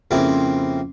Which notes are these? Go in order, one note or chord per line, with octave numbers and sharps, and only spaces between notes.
F2 C#3 A#3 C4 E4